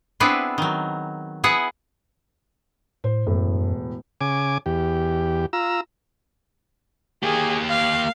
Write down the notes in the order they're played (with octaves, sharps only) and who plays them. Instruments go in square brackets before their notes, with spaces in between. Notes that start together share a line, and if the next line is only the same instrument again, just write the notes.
[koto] B3 C4 D4 E4 G#4 B4
D#3 F#3
B3 E4 G#4 B4 F#5
[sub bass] A2 [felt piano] C5
[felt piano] E1 A2 [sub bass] F#2
[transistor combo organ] C#3 G#5 D6
E2 G4
F4 A#5 E6
[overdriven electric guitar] A#3 G4 [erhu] G#4
[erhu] F5